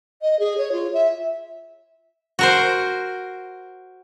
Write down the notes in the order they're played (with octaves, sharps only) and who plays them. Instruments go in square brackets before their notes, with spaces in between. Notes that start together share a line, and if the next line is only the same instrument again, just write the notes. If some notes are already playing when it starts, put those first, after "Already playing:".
[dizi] D#5
G#4
C#5
F4
E5
[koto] F#4 A#4 C5